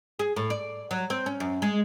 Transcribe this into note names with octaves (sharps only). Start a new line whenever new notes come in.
G#4
A2
D5
F#3
C4
C#4
F#2
G#3